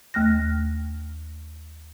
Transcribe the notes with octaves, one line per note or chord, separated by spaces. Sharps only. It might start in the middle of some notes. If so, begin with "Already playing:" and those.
D#2 A3 F6 F#6 A#6